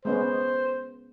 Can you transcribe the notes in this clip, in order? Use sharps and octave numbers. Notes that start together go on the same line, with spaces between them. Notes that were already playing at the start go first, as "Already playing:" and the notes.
G#3 B3 C#4 C5